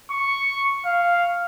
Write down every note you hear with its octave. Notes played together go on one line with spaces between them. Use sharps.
C#6
F5